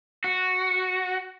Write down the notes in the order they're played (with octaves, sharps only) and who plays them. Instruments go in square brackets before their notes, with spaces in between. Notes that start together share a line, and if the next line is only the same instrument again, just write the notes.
[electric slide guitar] F#4